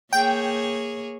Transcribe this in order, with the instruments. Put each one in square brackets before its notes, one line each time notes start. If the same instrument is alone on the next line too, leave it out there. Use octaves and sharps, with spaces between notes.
[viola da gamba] A#3 G#4 C#5 [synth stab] G5